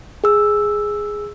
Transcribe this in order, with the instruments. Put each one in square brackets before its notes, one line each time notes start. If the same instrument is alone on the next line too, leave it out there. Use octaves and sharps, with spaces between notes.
[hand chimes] G#4 E6